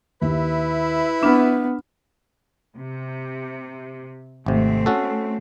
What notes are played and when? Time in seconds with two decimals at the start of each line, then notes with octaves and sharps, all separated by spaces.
0.22 D#2 E4 B4 E5
1.23 B3 D4 B5 F6 E7
2.76 C3
4.46 G#1 C3 A3 C4
4.86 C#4 F#4 A4